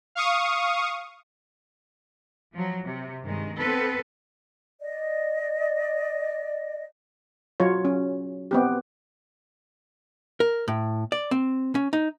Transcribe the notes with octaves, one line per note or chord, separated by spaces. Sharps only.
F5 C#6 D#6
F3 F#3
C3
G2 D#3 G#3
B3 C4 A4 B4
D5 D#5
F#3 F4 C#5
C#4
B3 C4 G4
A#4
A2
D5
C4
C#4
D#4